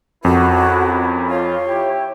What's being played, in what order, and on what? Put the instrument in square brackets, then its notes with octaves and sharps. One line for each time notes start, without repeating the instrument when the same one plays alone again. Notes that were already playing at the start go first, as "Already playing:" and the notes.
[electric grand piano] F2 [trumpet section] C#4 E4 A#4 [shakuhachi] F#4
[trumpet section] F4 [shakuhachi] C#5
[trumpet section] E4 G4